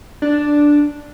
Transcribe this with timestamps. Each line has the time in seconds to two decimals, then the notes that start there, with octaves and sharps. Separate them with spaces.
0.22 D4